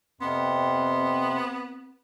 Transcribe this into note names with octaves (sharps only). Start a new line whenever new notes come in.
F2 C3 B3 C4 C6